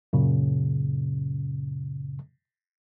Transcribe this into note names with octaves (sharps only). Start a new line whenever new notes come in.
F#2 A#2 C#3